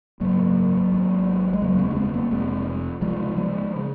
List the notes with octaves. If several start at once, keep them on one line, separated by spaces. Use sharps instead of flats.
G#1 F#2 C#3 F#3 A#3
G#1 G#2
G#3
F1 D#2 C#3 F#3 A#3
G#3 C4
C#4
G#3 C4
A#3 C#4
F1 F2 C3 G#3 C4
C#2 C3 F3 G#3
F3 G#3
C#3